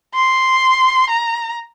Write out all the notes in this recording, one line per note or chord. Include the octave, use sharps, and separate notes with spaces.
C6
A#5